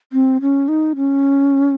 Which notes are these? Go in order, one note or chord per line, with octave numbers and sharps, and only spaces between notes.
C4
C#4
D#4
C#4